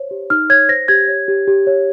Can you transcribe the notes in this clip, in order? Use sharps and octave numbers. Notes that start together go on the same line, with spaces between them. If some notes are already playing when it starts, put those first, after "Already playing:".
Already playing: C5 C#5
G4
D#4 F6
C#5 G#6
C5 A#6
G4 G#6
C#5
G4
G4
C#5